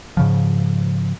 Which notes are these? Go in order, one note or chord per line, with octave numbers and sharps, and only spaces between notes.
G#2 C#3 F3